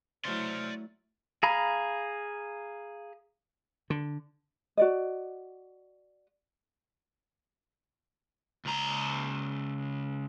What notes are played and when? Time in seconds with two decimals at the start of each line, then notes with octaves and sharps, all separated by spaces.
0.25 F#3 A3 E4 C5 D5 C6 F6
1.43 G#4 F5 A#5 B5
3.90 D3
4.77 F#4 D5 D#5
8.65 C#2 A#5